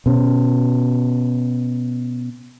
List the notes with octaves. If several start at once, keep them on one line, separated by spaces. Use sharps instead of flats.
B2 C#4